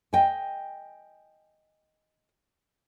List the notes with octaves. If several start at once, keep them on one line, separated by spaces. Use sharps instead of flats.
D#5 G5 G#5